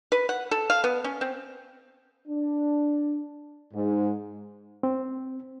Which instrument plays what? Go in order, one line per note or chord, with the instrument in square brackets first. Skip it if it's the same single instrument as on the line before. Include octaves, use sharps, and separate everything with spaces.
[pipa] B4
F#5
A4
F5
B3
C#4
C4
[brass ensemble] D4
G#2
[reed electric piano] C4